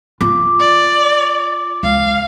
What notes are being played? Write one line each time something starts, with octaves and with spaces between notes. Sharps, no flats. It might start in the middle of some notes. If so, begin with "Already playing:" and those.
F4 D6
D5
C#2 F5